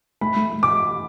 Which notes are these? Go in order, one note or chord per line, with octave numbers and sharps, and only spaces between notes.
A3 B5
A3
A3
D6